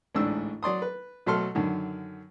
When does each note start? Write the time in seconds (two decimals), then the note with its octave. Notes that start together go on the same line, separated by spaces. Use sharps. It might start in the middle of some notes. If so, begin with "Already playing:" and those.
0.15 A1 D2 G#2 D4 E6
0.63 F#3 D5 C6 D#6
0.82 B4
1.26 B2 F#3 A3 A4 C6 F6
1.55 F#2 D3 D#3